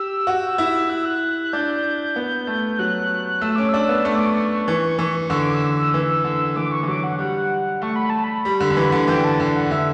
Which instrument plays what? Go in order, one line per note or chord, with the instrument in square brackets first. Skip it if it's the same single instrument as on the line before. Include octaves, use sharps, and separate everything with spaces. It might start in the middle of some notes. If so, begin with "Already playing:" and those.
Already playing: [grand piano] G4 [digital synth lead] E6
[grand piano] F#4
E4
[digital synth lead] F#6
E6
F#6
F#6
[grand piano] D4 [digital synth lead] G6
[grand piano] B3
A3
[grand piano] F#3 [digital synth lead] F#6
[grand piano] A3 [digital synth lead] E6
[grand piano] C#4 [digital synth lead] D6
[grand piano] D4 [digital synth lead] E6
[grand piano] B3
[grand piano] A3 [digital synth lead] C#6
[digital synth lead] D6
C#6
[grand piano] E3
E3
[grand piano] D3 [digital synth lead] E6
[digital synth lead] D6
E6
[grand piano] E3
D3
[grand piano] E3 [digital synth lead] D6
[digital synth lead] C#6
[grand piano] E3
[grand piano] F#3 [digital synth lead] D6
[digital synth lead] F#5
[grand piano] G3 [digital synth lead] F#5
[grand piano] A3 [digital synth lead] C#6
[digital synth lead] B5
A5
B5
[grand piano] G3
D3
D3
E3
D3
[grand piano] E3 [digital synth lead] G5
[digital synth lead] A5
[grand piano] D3
[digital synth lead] F#5
[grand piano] D3 [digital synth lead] E5